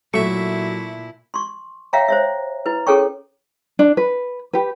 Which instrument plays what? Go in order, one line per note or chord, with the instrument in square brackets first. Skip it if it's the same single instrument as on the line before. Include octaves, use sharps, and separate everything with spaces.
[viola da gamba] A#2 E4 [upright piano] F#3 [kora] A3 [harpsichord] E5 C#6
[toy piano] C6 C#6
C#5 E5 F5 G5 A#5
C5 C#5 E5
E4 B4
C#4 G#4 A4 C#5 G5 C#6
[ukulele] D4
B4
G4 B4